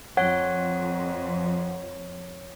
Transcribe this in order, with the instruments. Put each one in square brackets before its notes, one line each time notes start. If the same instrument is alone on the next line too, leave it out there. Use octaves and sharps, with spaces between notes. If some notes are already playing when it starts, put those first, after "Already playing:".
[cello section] F2 [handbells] C#5 [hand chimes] F#5